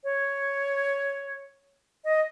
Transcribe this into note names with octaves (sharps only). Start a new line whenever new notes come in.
C#5
D#5